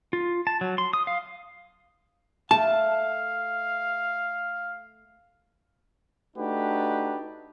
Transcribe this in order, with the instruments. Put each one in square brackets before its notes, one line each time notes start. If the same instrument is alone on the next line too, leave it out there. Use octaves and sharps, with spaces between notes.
[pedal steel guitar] F4
A5
F#3
C6
D#6
F5
[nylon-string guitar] A3 [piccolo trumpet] F5 [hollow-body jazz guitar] A5
[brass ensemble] A3 D4 D#4 F#4 G4 B4